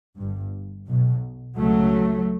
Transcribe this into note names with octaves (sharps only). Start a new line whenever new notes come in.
G2
G1
B1 B2
C#2 C#3 F#3 A3